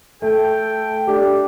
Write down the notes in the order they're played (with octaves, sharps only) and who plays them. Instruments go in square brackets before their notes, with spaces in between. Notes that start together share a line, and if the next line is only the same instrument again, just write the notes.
[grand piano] A3 [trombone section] A4 [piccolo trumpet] G5
[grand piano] A3 [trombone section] D4 [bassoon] G4